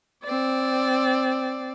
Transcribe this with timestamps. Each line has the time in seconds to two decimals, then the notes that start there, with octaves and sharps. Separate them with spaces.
0.24 C4 D5